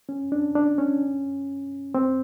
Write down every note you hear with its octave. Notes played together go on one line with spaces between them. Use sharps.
C#4
D4
D4
C#4
C4